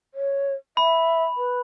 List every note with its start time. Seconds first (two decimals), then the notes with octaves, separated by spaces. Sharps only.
0.14 C#5
0.77 E5 B5
1.37 B4